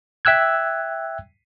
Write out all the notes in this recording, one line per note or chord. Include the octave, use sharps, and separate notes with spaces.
E5 G5 E6 F#6 G#6